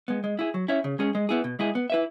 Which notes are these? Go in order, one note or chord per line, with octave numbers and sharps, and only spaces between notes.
G#3 B3
G#3
E4 G#4
F#3
C#4 E4 C#5 E5
C#3
G#3 C#4 G#4
G#3
B3 E4 G#4
B2
G#3 E4 G#4
B3
E4 B4 E5